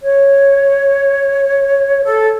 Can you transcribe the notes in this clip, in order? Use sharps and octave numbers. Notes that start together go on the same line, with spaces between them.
C#5
A4